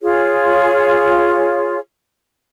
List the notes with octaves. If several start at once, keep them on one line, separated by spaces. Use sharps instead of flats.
F4 G#4 C#5